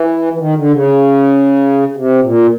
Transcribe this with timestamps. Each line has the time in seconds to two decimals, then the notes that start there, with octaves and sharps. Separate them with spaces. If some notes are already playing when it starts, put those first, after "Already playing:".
Already playing: E3
0.33 E3
0.39 D#3
0.56 D3
0.73 C#3
1.97 C3
2.23 A#2